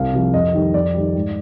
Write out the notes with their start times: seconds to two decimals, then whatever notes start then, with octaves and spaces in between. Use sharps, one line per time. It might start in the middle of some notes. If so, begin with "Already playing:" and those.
Already playing: C2 F5
0.13 C3 F3
0.33 F2 D#5
0.54 D#3 G3
0.74 F2 D5
0.94 D#3 G3
1.15 G#2